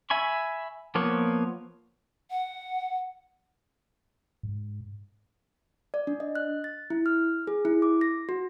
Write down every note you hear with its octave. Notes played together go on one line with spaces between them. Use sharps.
E5 G#5 B5 C#6
F3 A#3 B3 C#5
F#5
G#2
D5
D4
D#5
F#6
A6
E4
F6
G#4
E4
D6
A#6
F#4